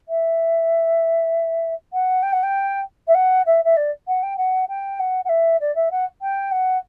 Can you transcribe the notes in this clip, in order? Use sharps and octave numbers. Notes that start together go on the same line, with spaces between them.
E5
F#5
G5
F#5
G5
E5
F#5
E5
E5
D5
F#5
G5
F#5
G5
F#5
F#5
E5
D5
E5
F#5
G5
F#5